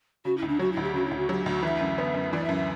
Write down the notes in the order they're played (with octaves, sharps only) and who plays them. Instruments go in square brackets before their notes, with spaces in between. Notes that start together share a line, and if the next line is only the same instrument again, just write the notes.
[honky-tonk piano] C#3 [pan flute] F#4
[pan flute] E4
[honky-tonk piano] D2
[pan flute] D4
[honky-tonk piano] F#3 [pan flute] F#4
[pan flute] E4
[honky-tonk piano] D2
[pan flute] G4
[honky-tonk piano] C#3 [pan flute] F#4
[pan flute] E4
[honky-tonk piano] D2
[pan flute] F#4
[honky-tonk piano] F#3 [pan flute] G4
[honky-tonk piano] D2 [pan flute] F#4
[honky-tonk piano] E3 [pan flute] E5
[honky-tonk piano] F#2
B3
F#2
[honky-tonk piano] E3 [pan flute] D5
[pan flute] E5
[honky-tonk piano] F#2
[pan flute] E5